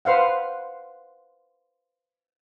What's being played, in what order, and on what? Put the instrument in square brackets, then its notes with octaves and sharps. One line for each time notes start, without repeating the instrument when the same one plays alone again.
[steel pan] B4 C5 F5 F#5